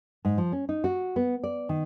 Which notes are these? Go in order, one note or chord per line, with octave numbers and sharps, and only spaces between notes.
G#2
F3
C#4
D#4
F#4
B3
D5
D#3